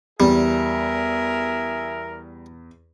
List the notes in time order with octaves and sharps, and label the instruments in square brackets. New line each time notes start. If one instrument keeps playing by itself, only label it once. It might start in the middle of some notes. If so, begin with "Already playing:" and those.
[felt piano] E2 [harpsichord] G3 [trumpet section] G#4 A#4 E5